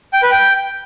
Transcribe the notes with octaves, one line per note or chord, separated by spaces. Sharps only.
G5
B4
G5